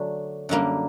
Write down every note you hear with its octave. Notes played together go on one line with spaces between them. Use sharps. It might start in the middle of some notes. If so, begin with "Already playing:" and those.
Already playing: D3 F#3 A3 D4
F#2 D3 G3 A#3